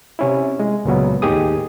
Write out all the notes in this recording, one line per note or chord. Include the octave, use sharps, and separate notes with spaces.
C3 C#4 E4
G#3
C#2 A#2 C#3 F#3 B3
D#2 A2 D#3 G4 G#4 D#6